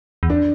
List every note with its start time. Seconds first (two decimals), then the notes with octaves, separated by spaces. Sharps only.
0.23 E2
0.30 D4